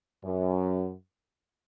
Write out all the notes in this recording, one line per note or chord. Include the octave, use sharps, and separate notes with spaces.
F#2